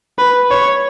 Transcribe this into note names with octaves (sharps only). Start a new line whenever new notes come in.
B4
C#5